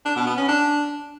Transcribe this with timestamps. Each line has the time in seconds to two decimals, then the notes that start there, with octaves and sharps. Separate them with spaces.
0.05 D4
0.16 B2
0.27 B3
0.37 C#4
0.48 D4